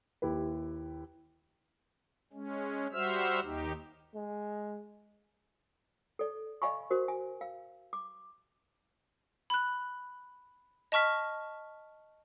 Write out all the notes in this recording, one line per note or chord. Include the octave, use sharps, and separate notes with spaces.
D#2 E4 G4 B4
G#3 C#4
G3 F#4 C5 E5 E6 F6
D#2 D#4 G4
G#3
A4 D5
D5 D#5 F5 G#5 B5 C#6
F#4 A#4 C5
G#5
F5
D6
B5 F#6
D#5 A5 C#6 F6 B6